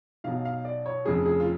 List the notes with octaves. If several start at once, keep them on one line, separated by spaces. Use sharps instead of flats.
B1 B2 F#3 F5
F5
D5
C#5
F1 F2 C#3 G#4
G#4
F4